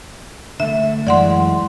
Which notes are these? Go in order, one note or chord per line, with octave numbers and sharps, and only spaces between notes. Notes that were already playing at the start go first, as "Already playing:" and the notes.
D3 A3 E5
F#2 E3 G#3 D5 F#5 C6